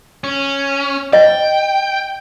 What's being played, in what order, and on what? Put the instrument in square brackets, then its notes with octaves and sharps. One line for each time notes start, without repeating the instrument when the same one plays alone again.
[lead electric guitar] C#4
[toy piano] D#5 [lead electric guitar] G5